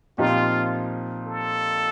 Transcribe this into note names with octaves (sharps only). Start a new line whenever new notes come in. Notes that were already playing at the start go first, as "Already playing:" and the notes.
A#2 F3 C4 D#4 F4 G4
A4